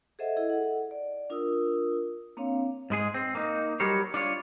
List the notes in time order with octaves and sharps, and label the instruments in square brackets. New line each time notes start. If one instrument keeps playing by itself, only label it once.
[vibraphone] G#4 A4 C5 D#5 E5 F#5
E4 G#4 A4 D#5
A4 F#5
D5
D4 F4 A#4 D#6 E6
A#3 C4 D4 C#5 F5
[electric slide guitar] G#2 G#3 G#4
C4
A#3 D#4
F#3 G3 G4 A#4 C5 C#5
D4 F4 C#5